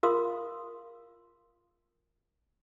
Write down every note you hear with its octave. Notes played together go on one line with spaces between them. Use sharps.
F4 A#4 F5 C6 D#6